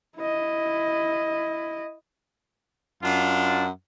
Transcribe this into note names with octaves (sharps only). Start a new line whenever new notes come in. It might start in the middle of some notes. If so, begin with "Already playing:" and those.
E4 D#5
F#2 D4 F4